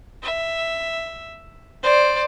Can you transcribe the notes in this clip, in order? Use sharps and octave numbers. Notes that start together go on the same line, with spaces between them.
E5
C5 D5